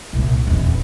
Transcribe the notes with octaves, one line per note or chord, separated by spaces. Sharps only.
C2 A#2
D#1 E2